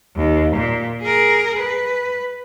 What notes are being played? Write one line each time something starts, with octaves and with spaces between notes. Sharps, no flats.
D#2
A#2
G#4 A#4
B4